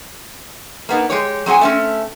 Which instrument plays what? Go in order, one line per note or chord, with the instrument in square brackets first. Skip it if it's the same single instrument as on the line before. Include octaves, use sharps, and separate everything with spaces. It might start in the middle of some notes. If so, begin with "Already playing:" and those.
[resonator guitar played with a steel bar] A#3 B3 D#4
G#3 G4 C#5
F#3 C4 G#4 F#5 G#5
A3 C4 C#4